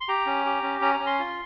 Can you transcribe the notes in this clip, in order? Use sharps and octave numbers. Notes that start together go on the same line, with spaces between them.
C6
G4 A#5
C#4
G4
C#4
C#4 A#5
A#5
C#4
C6
F4